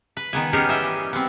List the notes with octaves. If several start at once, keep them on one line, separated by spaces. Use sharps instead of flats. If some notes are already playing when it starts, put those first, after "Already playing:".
B4
D#3 B3 G#5
B3 C#4 D#4 G4 G#4 A#4
E3 D#5 E5
G3
B3 C4